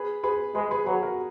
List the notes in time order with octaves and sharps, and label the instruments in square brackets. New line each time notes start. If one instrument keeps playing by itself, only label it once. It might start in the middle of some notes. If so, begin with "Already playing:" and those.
Already playing: [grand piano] G#4 B4
G#4 B4
[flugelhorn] G#3 [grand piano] G#4 B4
[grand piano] G#4 B4
[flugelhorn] F#3 [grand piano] G#4 B4
[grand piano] F#4 A#4